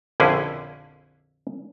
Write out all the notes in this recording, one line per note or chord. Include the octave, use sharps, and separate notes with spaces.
A#1 F2 D3 C#4 E4 G#4